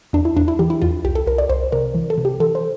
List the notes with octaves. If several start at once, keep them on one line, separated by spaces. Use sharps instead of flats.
E2 D4
E4
E2 D4
E4
E3 G4
E4
E2 F4
C2 G4
A4
C2 A#4
D5
C2 C5
C3 A#4
E3
A4
C3
G4
E3 A4
C5